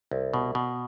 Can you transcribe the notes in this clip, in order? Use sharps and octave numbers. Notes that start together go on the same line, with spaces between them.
C2
B2
B2